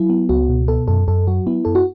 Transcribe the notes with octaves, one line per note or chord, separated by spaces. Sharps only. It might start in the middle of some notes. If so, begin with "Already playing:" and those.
Already playing: F#3 E4
B3
C#2 F#4
B2
B3 A4
F#2 A4
F#2 A4
F#3 F#4
B3 E4
F#2 A4
F#4